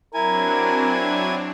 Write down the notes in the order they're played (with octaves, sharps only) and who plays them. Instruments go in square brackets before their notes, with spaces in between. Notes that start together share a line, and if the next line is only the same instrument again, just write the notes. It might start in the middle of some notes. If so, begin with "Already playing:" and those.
[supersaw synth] F#3 C4 D4 [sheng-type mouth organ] E4 G#5 [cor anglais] A#4